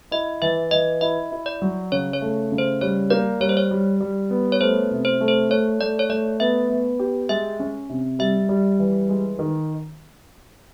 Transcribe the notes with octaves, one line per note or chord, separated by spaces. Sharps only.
E4 D#5
E3 E5
E3 D#5
E4 D#5
E4
D5
F#3
C#3 C#5
C#5
A3
C#3
C5
G3 C#5
A#3 D5
G3 C#5
C5
C#5
G3
G3
B3
C#5
A3 C5
C3
C5
A3
C5
A3 C#5
A3 D5
C#5
A3 D5
B3 E5
B3
G4
G#3 E5
C#4
C3
G3 E5
G3
E3
G#3
D#3